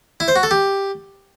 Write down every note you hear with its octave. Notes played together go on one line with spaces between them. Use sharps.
E4
C5
F#4
A4
G4